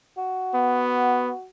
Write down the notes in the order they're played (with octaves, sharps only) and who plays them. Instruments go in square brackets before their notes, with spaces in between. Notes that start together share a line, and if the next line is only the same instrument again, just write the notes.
[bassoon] F#4
[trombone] B3